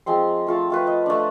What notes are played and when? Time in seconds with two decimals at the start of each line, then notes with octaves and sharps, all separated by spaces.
0.06 F3 G#3 C4 C6
0.47 A3 F4 A4
0.70 A3 F4 B4
0.87 D#5
1.06 A3 D4